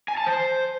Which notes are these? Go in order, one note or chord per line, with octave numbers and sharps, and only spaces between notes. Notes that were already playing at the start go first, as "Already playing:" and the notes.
G#5
A5
C5